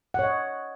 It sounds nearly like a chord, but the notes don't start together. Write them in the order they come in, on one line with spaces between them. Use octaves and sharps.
F#5 C#5 D#5